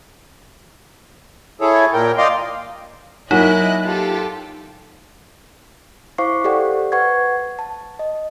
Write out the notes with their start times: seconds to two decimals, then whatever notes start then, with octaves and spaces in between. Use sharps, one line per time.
1.61 E4 G#4 A4 C#5
1.94 A#2 A#4 G5
2.18 D5 D#5 F5 G5 C6
3.31 F#3 A#3 D#4 E4 F#4 D#5 F#6
3.84 F4 G4 A4
6.18 E4 C5 F5 C#6 D6 C7
6.44 G4 A4 C5 D5 F#5 G5
6.92 B4 F#5 C#6 G#6
7.59 A5
7.99 D#5